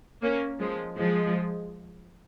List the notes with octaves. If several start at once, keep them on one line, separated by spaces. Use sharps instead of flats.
A#3 C#4
F3 G#3
F3 G#3